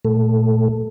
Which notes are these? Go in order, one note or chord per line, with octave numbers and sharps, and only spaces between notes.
A#2 A3 A4